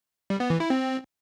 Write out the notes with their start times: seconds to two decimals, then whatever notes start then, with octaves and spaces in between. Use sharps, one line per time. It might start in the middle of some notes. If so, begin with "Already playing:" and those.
0.30 G3
0.40 B3
0.50 E3
0.60 E4
0.70 C4